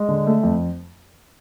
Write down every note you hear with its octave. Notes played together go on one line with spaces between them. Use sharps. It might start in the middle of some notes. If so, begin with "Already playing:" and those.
Already playing: G#3
D3
A3
F2